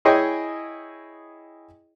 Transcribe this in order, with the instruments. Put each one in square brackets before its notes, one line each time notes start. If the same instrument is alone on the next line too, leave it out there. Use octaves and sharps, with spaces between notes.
[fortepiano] E4 G#4 C#5 D#5 G5 G#5